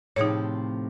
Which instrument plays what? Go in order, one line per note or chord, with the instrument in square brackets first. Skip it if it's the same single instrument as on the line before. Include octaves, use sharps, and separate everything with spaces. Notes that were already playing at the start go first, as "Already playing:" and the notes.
[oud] A2 C3 F3 [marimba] D#4 G#4 C#5